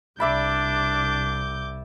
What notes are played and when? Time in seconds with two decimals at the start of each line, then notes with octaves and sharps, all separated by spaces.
0.20 C2 D4 D5 E5 B5 D6 G6